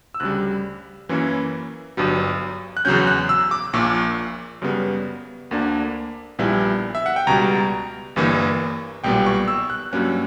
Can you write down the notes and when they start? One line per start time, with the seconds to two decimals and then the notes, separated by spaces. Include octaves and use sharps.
0.14 E6
0.20 D2 C#3 G3 F#6
1.09 F#2 E3 A#3 C#4 E4
1.97 G1 G2 F#3
2.77 F#6
2.85 E2 C#3 F#3 C#4 G6
3.07 F#6
3.29 E6
3.51 D6
3.73 A#1 A#2 A#3 C#6
4.62 F#2 C#3 G3 B3
5.51 D2 D3 A#3 D4
6.39 A#1 A#2 G3 B3 E4
6.95 E5
7.06 F#5
7.16 G5
7.27 C#2 B2 G3 A#5
8.16 G1 G2 E3 A#3
9.04 B1 A#2 G3 B3 G5
9.26 C#6
9.48 E6
9.70 F#6
9.92 G2 F#3 A#3 C#4 F#6